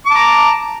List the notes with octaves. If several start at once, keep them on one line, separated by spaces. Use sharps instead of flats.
A5 A#5 D6